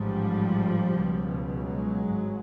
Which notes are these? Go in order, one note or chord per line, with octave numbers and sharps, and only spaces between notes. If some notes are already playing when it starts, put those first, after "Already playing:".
Already playing: A1 G#2 F3 G3
C#2 B2
F#3 G#3
G#1 G2